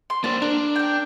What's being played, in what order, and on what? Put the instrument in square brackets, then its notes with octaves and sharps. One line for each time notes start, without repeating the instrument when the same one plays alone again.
[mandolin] C6
[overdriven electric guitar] A#3 C5 [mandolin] D4
[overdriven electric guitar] D4 [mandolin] A#4
[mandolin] A#4 G5